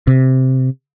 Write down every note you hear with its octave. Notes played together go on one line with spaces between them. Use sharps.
C3